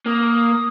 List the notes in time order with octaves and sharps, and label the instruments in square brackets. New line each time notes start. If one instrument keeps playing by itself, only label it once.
[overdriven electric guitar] A#3 [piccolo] D#6